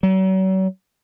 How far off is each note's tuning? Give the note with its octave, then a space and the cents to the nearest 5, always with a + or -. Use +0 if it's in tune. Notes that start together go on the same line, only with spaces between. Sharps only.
F#3 +40